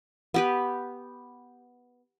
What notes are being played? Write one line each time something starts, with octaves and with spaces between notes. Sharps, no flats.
B3 G4 B4